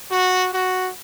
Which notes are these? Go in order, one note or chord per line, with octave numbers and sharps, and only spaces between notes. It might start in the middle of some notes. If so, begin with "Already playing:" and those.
F#4
F#4